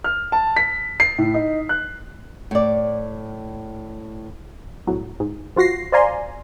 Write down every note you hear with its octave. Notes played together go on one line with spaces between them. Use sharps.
F6
A5
B6
C7
A2
D#4
F#6
A2 D5
C2 A2 F#3
G#2
F3 F4 F#4 A#6 C7
C5 D5 F5 G#5 A#5 C6